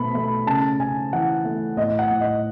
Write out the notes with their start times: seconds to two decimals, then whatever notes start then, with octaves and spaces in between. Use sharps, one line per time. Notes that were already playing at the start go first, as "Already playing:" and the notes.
Already playing: B2 A3 B5
0.14 A3 B5
0.47 C#3 A5
0.80 C#3 G#5
1.13 E3 F#5
1.45 A3
1.77 A2 D#5
1.99 F#5
2.10 A2
2.20 D#5